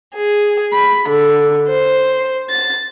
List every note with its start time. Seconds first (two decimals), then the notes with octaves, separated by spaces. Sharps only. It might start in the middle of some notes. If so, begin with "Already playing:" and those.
0.14 G#4
0.74 B5
1.08 D3
1.68 C5
2.49 A6